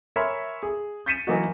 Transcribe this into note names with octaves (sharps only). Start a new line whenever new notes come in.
A#4 C#5 E5 G#5 B5 C6
G#4
G6 A6 B6 C#7 D#7 E7
E3 F#3 A#3 D#4 F#4